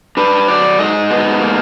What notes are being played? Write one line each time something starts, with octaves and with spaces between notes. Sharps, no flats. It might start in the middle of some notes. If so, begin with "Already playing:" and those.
D4 B4
F#3 D5
G#2 D#5
B3
A#3